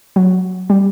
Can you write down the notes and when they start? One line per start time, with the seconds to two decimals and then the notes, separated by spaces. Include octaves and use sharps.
0.16 F#3
0.70 G3